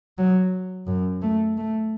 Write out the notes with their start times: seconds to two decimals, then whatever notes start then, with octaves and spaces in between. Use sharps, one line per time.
0.18 F#3
0.87 F#2
1.22 A3
1.58 A3